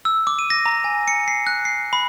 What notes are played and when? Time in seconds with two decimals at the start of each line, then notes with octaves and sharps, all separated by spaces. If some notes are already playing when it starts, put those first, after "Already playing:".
0.05 E6
0.27 D6
0.39 D#7
0.50 A#6
0.66 A#5
0.84 G#5
1.08 C#7
1.28 C7
1.47 F#6
1.65 C7
1.93 B5